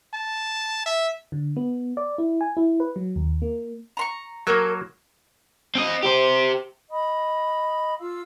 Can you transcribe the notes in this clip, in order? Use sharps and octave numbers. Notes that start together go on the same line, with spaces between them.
A5
E5
D3
B3
D5
E4
G#5
E4
B4
F#3
D#2
A#3
A#5 C6 C#6
F#3 A#3 A4 A#4 C#5
C4 D#5
G4 C5
D#5 B5 D#6
F4 F5 E6